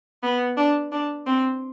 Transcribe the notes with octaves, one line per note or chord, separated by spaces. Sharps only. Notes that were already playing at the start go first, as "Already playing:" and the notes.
B3
D4
D4
C4